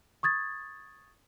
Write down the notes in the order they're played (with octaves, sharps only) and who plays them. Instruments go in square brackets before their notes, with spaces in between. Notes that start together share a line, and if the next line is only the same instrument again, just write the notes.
[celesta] C#6 D#6 G#6 A6